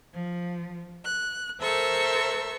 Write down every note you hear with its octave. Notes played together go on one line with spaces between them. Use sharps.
F3
F#6
A4 A#4 C5 E5 C#6 E6